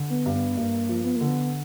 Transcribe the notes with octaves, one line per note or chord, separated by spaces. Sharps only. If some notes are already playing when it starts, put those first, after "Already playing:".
Already playing: D3
B3
G2
B3
G2 A#3
F3
B3
D3 A#3
B3